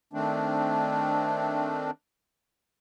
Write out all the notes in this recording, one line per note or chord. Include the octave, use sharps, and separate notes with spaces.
D#3 A3 C4 D4